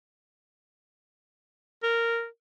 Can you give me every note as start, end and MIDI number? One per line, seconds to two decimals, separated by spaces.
1.83 2.26 70